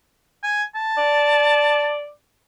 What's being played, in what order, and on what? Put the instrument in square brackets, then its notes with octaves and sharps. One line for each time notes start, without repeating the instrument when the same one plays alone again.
[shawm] G#5
A5
[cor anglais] D5